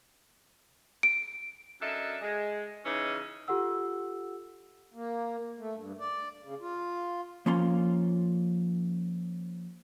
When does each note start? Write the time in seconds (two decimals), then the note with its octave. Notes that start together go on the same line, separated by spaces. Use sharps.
1.03 D7
1.81 F#2 D4 A4 D#5 E5
2.22 G#3
2.85 C#3 E3 C#4 D#4
3.48 F4 G4 A4 F#5 E6
4.94 A#3
5.59 A3
5.75 G2
6.00 D5
6.43 C#3
6.61 F4
7.46 F3 A#3 C#4 F4 C6